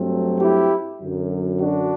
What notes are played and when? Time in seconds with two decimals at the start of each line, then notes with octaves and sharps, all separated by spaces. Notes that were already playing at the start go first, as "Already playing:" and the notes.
Already playing: G2 F#3 A3 C4
0.40 E4 G4
1.00 F#2 D3 F#3
1.60 D4 F#4